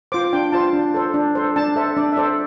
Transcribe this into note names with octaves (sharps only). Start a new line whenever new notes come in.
F4 C5 D6
D4 G5
F4 C5 A5
D4
A4 C5
D4
A4 C5
D4 A5
A4 C5 E5
D4 D5
E5
A4 C5 D5